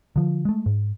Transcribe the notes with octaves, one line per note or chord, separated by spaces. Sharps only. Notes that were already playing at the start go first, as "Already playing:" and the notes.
D3 F3
G#3 A3
G#2